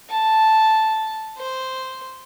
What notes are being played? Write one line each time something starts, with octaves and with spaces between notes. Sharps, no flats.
A5
C5